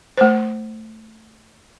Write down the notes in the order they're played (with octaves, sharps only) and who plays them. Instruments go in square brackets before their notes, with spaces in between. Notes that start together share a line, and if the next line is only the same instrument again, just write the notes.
[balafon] A3 C5